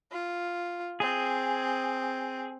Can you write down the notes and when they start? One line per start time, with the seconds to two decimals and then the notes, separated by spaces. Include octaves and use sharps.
0.12 F4
1.00 C4 G#4